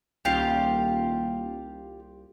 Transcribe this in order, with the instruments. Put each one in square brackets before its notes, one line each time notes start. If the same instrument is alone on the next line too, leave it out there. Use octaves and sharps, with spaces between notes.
[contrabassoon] D#1 [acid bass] C2 [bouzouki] F4 G4 F5